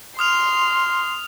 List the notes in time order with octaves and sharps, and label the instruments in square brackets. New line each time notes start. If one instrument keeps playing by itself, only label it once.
[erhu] C6 [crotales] D#6 F6 F7